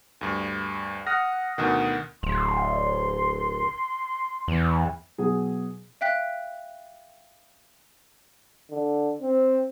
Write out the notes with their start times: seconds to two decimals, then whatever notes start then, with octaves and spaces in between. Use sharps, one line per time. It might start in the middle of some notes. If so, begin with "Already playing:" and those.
0.21 D2 G2
1.07 F#5 D#6 F6 A#6
1.58 D2 B2 D#3 F#5
2.23 D1 C6
4.48 E2
5.18 B2 F#3 G#4
6.01 E5 F5 G5 F#6 B6
8.70 D3
9.22 C4